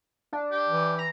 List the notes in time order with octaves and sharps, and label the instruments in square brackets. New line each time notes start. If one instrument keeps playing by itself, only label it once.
[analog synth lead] D4
[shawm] G4
[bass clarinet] E3
[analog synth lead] A#5